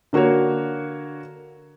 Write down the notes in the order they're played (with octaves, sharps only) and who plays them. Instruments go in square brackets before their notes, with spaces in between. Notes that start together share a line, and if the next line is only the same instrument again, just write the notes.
[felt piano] D3 A#3 F#4 A#4 C#5